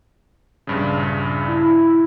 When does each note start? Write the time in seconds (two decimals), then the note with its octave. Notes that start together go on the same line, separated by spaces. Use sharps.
0.67 A#1 G2 C#3
1.47 E4